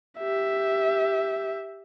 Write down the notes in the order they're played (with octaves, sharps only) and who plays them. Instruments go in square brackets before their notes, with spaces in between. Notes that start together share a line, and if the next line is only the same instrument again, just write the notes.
[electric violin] G4 E5